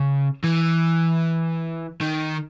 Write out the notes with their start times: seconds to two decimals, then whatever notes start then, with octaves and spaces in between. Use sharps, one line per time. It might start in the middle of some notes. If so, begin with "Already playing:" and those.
Already playing: C#3
0.44 E3
2.01 D#3